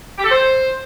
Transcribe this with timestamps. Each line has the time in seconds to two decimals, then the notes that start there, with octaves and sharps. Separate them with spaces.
0.17 G4
0.24 A4
0.30 C5